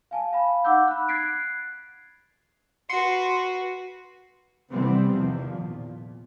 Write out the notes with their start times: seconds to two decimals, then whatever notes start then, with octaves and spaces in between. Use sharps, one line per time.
0.11 F5 G#5 A5
0.33 F5 B5
0.64 D#4 F#5 D6 E6 G6
0.88 B5 F#6
1.08 F#6 G#6 A6 B6 C7 D7
2.89 F#4 B4 C6 C7 C#7
4.71 C3 E3 G3 B3 C4
5.13 E2 C3 D#3 F3
5.54 A#2